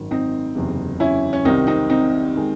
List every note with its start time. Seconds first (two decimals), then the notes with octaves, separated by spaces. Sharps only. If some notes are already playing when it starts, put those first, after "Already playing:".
Already playing: G#1 F#2 D#3
0.11 C4 D#4
0.55 F#1 E2 C3
1.00 C#4 E4
1.33 C#4
1.45 C2 C3 D#3 C4 D#4
1.67 C4 D#4
1.90 C4 D#4
2.36 D#3 G#3